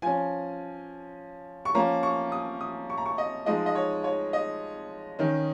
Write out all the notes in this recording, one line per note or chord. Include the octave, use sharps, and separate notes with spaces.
F3 C#4 G#5
C#6
F3 A#3 C#4 A#5
C#6
D#6
D#6
C#6
A#5
C#6
D#5
F3 G#3 D#4 D#5
D#5
C#5
C#5
D#5
D#3 C#4